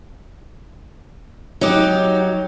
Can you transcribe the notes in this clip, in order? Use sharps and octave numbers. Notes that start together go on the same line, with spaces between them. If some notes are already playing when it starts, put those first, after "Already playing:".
F#3 D#4 G4